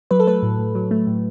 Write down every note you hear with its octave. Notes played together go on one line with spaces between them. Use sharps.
F#3 B4
A4
A3 B4
A2
A2
F#3
A3
A2